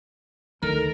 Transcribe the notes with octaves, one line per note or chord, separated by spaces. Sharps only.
D2 D#3 A4 A#4 A#5